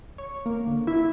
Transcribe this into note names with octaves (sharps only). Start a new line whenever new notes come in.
C#5
A#3
D3
E4